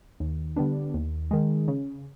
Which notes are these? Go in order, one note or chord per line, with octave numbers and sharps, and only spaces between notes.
D#2
D3 G3 B3 D4
D#2
D#3 G#3
C#3